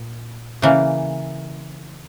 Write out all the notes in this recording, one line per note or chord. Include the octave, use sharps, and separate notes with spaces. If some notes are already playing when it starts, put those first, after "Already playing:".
Already playing: A#2
C#3 E3 A#3